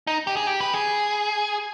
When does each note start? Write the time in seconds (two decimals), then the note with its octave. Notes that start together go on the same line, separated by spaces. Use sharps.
0.07 D#4
0.27 G4
0.37 G#4
0.47 G4
0.60 B4
0.73 G#4